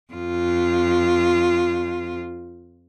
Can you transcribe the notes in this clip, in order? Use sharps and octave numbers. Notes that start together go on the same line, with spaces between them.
F2 F4